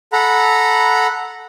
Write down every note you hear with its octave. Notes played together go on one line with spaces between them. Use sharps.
A4 F#5 A#5 B5